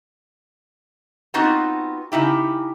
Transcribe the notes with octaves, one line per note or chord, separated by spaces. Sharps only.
B3 C4 D#4 F4 F#4
C#3 D#4 E4 G4